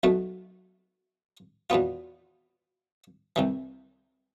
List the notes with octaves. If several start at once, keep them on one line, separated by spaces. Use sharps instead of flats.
B1 B2 A3
E2 B2 B3 F4
C2 C3 E3